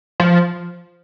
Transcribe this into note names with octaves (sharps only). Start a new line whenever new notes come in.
F3